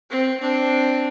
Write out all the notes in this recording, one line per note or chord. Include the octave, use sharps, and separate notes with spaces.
C4
C4 D4